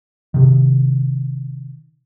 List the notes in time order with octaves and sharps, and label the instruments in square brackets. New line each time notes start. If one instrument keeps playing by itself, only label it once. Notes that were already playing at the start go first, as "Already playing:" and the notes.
[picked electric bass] C3 D#3